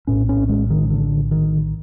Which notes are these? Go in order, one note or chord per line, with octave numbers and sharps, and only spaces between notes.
A#1 A2 C#4
C#4
G#3
D#3
D3
D#3